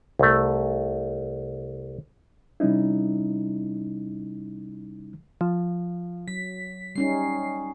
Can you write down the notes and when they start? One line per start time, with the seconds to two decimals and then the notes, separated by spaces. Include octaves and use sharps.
0.19 C2 A3
2.60 C3 G3 C#4 D#4 E4
5.41 F3
6.28 F#3 B6
6.96 G3 C#4 D#4 C7